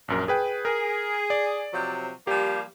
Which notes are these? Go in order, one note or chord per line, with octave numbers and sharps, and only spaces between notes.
A#1 F#2 A#4
G#4 B4 G5
G#4 A#4
D5
C3 F3 F#3
F3 G3 A#3 G4